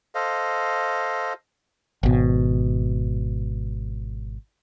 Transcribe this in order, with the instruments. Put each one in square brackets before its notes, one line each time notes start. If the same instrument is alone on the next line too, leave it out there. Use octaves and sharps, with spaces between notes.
[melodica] A4 C5 D#5 F5
[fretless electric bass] G#1 B2